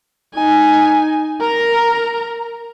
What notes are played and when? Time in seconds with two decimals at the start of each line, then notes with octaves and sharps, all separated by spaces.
0.34 D#4 G#5
1.41 A#4 A#5